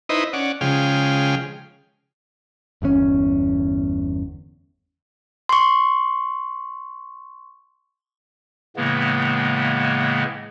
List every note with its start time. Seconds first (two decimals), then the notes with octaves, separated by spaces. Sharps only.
0.09 D#4 E4 B4 C5 D#5
0.33 C#4 D5 F#5
0.61 C#3 F3 G#3 G5 F6
2.82 G1 E2 D3 C#4
5.49 C6 C#6
8.76 A2 C#3 E3 G#3 A#3 B3